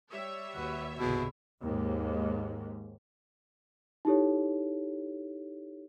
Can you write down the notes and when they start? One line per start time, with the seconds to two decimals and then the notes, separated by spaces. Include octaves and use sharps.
0.11 G3 C#5 E5
0.55 D#2 F#4 B4
0.99 G1 C2 B2 E4 G#4
1.62 D#2 G#2
4.05 D#4 E4 G4 A4 C#5